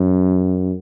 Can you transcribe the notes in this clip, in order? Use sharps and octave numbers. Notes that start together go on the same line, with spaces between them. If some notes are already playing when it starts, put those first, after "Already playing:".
Already playing: F#2